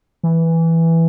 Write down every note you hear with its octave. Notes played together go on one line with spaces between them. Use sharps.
E3